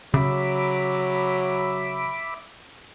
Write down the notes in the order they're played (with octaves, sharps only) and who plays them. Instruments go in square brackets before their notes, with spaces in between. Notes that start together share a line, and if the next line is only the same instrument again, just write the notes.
[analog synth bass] C#3 [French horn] F#3 [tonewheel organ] E5 B5 D6